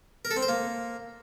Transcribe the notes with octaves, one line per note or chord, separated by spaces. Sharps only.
A#4
A4
C4
C5
A#3